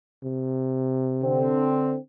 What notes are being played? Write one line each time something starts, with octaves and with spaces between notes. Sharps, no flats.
C3
D3 C4